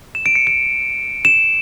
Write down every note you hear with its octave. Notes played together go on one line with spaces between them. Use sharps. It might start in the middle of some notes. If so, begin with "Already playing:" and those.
E7
D7
C#7
D7
E7